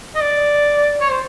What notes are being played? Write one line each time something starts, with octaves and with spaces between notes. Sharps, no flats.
D#5
D5
C#5
C5